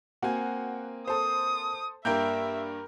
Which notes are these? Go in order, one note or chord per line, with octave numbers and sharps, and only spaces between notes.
A#3 C4 F#4 G#5
A4 C5 D#6
G2 A#3 A#4 E5 G5 G6